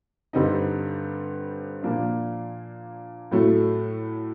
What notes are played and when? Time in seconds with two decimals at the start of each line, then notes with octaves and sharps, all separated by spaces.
0.33 G2 D3 G3 C4 D#4
1.83 A#2 F3 A#3 D4
3.31 A2 F#3 A3